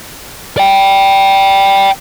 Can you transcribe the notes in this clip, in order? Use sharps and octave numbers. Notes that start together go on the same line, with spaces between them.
D5 G5